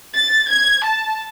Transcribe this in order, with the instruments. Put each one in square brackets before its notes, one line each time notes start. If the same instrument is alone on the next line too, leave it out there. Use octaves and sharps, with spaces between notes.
[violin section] A6
G#6
A5